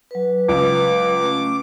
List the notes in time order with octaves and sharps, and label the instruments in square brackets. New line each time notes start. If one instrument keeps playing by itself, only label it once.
[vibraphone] F#3 B4
[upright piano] C#2 [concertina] D6
[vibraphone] A3 C#4